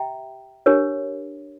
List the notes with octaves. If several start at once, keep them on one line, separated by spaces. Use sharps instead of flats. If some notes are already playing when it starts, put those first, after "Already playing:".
Already playing: G4 E5 G5 A#5
D4 G4 A#4 C#5